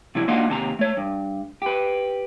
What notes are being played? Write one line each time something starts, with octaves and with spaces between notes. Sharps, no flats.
C3 F#3 E4
A#3 D4 D#4 F4 F#4 D#5
D#2 C3 A5 A#5
A3 C#5
G2
G4 B4